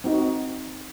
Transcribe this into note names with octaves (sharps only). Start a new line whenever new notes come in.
C4 D#4 F#4